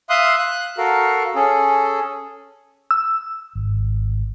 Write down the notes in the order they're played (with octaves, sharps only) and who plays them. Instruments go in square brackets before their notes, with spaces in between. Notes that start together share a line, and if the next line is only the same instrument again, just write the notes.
[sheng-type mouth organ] E5 F5 C6 D#6 F#6
F#6
F#4 A4 A#4 F5
C#4 G#4 A4
[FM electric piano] E6
[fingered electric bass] G#1